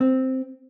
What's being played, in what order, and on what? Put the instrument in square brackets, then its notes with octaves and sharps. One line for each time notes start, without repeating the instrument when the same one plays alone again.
[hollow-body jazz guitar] C4